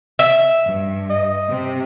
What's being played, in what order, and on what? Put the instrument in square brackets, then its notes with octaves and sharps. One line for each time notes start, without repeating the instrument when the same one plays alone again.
[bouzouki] E5
[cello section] G2
[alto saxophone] D#5
[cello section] C3